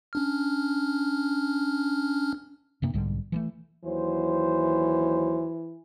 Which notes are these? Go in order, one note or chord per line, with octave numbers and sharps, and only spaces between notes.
C#4 D4 F6
F#2 C3 A#3 D4
B1 G#2 D3 G3
E3 G#3 A3
D#2 E3 F#3 C5